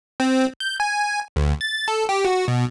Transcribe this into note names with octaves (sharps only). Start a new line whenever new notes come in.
C4
G6
G#5
D2
A6
A4
G4
F#4
B2